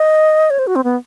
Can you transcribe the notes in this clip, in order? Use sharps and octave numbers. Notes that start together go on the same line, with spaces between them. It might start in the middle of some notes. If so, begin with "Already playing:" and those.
Already playing: D#5
C#5
C5
F#4
C4
B3